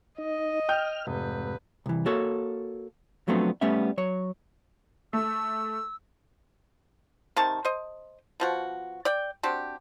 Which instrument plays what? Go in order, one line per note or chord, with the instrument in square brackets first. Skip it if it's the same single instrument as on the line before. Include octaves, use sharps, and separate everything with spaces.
[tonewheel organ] D#4 [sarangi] D#5
[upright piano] G5 G6 [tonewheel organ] F6
[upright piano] F1 [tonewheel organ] G#2 C3 [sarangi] B4
[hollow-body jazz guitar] C2 E3
A#3 F#4 A4 C#5
F3 F#3 A3 B3 C4 D4
G3 A3 B3 C#4 E5
F#3 C#5
[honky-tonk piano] A3 [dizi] E6
[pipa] C3 D#3 A5 C#6
C5 D#5
B2 F3 F#4
D5 G5
C4 D4 F#4 G4